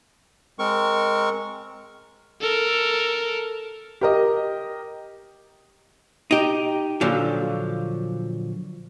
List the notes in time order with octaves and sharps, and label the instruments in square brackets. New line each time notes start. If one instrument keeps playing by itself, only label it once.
[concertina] G#3 C4 A#4 C#6
[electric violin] A4 A#4
[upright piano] G4 A#4 D#5
[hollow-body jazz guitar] D#4 G4
A#2 D3 F3 F#3